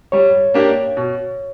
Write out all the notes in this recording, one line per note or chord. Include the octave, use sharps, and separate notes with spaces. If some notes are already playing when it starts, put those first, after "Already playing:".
G3 C#5
A#3 D4 G4 A#4
B2